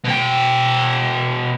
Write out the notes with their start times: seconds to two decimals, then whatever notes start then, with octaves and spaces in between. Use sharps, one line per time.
0.04 B2 G5